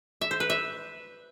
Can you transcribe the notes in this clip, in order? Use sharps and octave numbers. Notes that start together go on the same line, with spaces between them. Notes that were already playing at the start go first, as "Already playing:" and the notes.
E5
C5
B4
E5